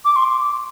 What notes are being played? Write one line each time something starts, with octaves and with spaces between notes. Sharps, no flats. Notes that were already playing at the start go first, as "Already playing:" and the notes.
D6
C6